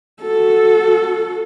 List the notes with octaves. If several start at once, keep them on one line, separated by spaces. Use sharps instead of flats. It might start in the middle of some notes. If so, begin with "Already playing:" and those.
F#4 A4